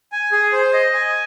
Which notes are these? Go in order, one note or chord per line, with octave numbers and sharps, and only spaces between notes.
G#5
G#4
C5
D#5
G#5